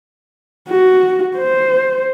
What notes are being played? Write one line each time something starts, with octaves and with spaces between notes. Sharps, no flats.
F#4
C5